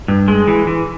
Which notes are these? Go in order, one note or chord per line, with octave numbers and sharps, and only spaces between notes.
G2
G#3
E3
E3